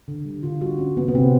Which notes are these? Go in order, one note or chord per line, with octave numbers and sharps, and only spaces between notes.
D3
G3
D3 F4
G3 F#4
G3 C#4
C3 B3
B3
C3 C4